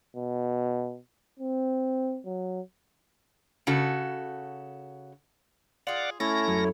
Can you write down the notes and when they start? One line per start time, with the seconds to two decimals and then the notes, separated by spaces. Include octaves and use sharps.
0.16 B2
1.40 C4
2.26 F#3
3.67 C#3 F#4 A4
5.87 F4 G#4 D5 F5 F#5
6.20 A3 C#4 E4 A4 C#5 A#6
6.48 F#2